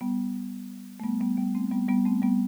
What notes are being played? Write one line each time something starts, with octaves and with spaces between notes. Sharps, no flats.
G3 B3
A3
G3 B3
G3 B3
G3 B3
A3 C4
G3 B3
G3 B3
A3 C4
G3 B3